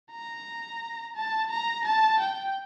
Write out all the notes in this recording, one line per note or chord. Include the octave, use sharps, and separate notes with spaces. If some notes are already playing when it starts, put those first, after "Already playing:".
A#5
A5
A#5
A5
G5